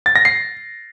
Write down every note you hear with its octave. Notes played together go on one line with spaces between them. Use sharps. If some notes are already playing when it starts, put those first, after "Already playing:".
A6
A#6
C7